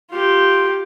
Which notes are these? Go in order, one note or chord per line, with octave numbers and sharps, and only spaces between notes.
F4 G4